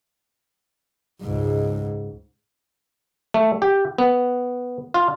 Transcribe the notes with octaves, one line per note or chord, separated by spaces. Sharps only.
C#2 G#2
A3
G4
B3
F4